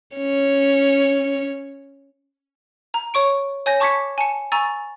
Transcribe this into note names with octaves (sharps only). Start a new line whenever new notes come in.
C#4 C#5
A#5
C#5 C#6 D7
C#5 G#5 G6 A#6
A5 C#6 D6 G#6 B6 C#7
G#5 A5 C#7
G#5 A#5 C#6 E6 A6